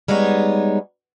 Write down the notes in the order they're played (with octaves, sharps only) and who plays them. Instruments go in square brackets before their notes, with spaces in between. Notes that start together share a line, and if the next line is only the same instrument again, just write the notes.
[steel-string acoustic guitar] G3 G#3 B3 D#4 C#5